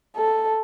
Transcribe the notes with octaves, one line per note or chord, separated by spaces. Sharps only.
A4